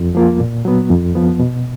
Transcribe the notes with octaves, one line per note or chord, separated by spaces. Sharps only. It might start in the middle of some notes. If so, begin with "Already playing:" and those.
Already playing: F2
F3 A#3 F4
A#2
F#3 B3
F2
F3 B3
B2